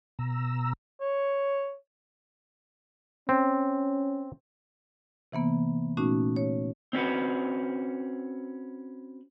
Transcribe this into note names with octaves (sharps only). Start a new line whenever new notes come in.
B2 A#5 E6
C#5
C4 C#4
C3 E3 A#3 B3
A#2 A3 C#4 D#4 F#4
C#5
C4 C#4 F#4 B4